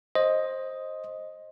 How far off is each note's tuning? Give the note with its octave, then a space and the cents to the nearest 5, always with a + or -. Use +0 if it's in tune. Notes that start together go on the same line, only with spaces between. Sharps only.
C5 +15 D#5 +5